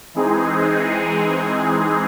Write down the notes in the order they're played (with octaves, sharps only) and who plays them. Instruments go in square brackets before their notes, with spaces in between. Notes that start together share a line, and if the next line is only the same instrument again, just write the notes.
[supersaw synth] E3 G#3 C4 D#4 G#4